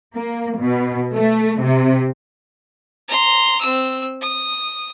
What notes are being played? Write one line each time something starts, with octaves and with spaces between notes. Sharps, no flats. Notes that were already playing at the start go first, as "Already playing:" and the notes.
A#3
B2
A3
C3
A#5 C6
C4 E6
D#6